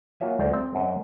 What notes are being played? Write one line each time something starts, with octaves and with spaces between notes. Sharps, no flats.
A#3 F4 F#4 C#5 E5 G#5
D2 C5 D5 A#5
C4
F#2 C5 D#5